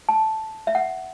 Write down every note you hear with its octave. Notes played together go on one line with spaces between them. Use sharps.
A5
E5
F#5